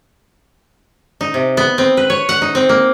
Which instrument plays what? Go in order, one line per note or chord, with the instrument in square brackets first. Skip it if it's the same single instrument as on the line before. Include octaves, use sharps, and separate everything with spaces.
[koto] D#4
C3
B3
C4
B4
C#5
F#5
D#4
C4
A#3